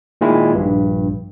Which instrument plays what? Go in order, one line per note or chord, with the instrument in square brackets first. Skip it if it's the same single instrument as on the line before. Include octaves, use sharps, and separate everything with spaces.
[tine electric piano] A#2 D#3 G#3 E4
A#1 G2